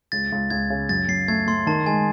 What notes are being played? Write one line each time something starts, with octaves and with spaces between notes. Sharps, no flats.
C#2 A6
C#2
C#2 G#6
C#3
F#2 A6
F#2 C7
A3 G#6
A3 C6
D#3 A5
G#3 G#5